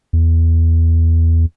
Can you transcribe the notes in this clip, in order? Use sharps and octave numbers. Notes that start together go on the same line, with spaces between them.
E2